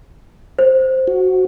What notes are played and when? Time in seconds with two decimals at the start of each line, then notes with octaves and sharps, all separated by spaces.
0.59 C5
1.08 F#4